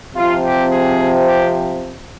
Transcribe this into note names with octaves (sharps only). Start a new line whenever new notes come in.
C3 F3 C4 F4
G4
G#4
G4